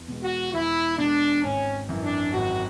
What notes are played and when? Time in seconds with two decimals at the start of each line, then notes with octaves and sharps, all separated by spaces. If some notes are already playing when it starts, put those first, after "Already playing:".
Already playing: E2
0.08 B2 G#3
0.23 F#4
0.53 E2 E4
0.98 B2 G#3 D4
1.44 G#1 C#4
1.89 F#2 E3
2.03 D4
2.33 G#1 F#4